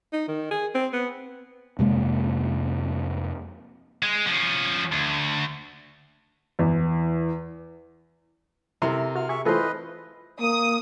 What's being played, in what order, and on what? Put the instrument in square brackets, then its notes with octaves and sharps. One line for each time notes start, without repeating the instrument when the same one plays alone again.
[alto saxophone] D#4
D#3
G#4
C4
B3
[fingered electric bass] F2 C3 G#3 A#3
[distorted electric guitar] G#3
F3 C#4
D2
[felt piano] E2
[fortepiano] C3 C6 [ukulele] E4 A4 A#4
[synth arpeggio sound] F#4 [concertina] F6
[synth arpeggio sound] G#4 [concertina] E5 C#6
[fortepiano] E3 [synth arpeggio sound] A3 A4 [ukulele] F4 C5 [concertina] B4 D#5
[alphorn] A#3 [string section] D#6